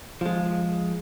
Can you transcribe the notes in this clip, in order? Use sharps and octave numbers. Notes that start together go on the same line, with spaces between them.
F3 G#3